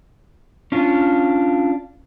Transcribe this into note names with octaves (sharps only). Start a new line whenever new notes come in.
C#4 D4 F4